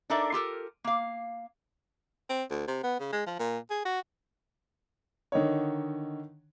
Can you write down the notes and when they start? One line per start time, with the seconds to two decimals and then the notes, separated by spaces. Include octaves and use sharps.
0.10 D4 D#4 A4 A#4 D5 E5
0.32 F4 G4 A4 A#4
0.84 A#3 F5
2.29 C4
2.50 D2
2.67 C3
2.84 B3
3.00 C#3
3.12 G#3
3.26 F3
3.39 A#2
3.70 G#4
3.85 F#4
5.32 D3 D#3 D#4 C#5